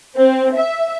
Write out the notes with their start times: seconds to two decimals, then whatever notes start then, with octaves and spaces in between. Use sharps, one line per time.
0.17 C4
0.57 E5